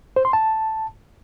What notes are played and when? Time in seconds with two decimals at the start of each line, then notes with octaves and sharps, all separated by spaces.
0.16 C5
0.25 C6
0.33 A5